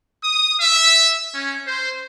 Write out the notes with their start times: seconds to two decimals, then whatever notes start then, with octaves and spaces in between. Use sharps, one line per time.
0.23 D#6
0.61 E5
1.33 C#4
1.66 C5